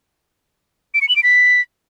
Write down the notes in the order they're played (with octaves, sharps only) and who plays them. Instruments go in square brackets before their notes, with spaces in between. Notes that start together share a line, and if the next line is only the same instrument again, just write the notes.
[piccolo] D7
C#7
F#7
D7
B6